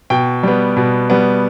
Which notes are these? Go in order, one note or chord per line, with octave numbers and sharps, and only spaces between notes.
B2 G5
G3 B3
B2
G3 B3